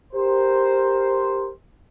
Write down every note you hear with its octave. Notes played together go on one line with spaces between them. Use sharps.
G4 A#4 C5